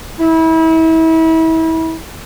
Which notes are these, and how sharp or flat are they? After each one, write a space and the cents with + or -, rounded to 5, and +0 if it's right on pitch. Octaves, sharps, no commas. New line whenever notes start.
E4 -30